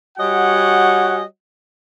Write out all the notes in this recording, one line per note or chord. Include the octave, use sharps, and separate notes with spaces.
G3 F#4 C#5 D#5 F#5 G#5